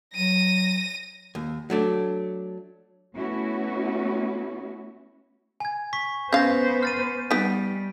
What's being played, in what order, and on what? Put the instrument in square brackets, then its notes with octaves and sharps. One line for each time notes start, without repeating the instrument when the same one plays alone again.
[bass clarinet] F#3 [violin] A#6 D#7
[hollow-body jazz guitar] D#2
F#3 A3 D4
[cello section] A3 B3 C#4 E4 F#4
[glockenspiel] G#5 G#6
C#6 B6
[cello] B3 C5 [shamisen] C#4 F5 [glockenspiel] G6 A#6
[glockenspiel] F6 A6 D#7
[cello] G3 [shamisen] B3 D#4 [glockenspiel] B6 D7